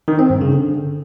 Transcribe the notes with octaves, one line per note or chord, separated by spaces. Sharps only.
D#3
C4
G2
C#3
D3